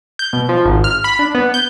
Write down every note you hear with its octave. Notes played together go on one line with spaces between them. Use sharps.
G6
B2
F3
G#1
F6
B5
D4
B3
G6